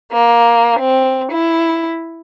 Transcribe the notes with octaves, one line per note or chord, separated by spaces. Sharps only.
A#3
C4
E4